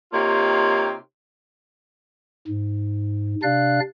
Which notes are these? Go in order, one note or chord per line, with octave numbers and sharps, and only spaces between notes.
C3 A#3 D#4 F4 G4 C#5
G#2
C3 D4 D5 F5 F#6